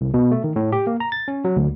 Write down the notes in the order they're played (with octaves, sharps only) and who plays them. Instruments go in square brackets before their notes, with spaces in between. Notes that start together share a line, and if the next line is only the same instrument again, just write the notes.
[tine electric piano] C2
B2
A3
D#3
A2
G4
A#3
A#5
A6
C#4
F#3
D2